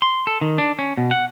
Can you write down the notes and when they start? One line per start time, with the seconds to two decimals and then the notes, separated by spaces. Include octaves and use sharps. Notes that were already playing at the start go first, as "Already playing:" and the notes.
0.02 C6
0.27 A4
0.41 D#3
0.58 D4
0.79 C#4
0.97 B2
1.11 F#5